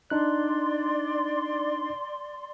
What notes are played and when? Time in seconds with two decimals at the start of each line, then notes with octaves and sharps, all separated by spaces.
0.10 D4 D#4 D5 C6 F#6